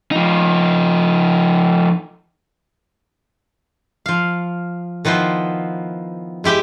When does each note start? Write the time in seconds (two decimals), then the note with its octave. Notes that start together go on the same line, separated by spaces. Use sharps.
0.11 F3 D#4
4.06 F3 F5
5.05 D#3 F3 B3 E4 C5
6.44 G#3 E4 G4 E5 G5